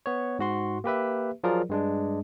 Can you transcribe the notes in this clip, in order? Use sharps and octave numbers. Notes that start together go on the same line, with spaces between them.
B3 C#5
G#2 F#4 C6
A#3 G4 B4 E5
F3 F#3 F4 G#4 A#4 D5
G2 G#3 D4